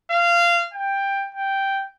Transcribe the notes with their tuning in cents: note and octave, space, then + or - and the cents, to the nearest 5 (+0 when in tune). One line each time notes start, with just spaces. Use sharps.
F5 -20
G5 +10
G5 -5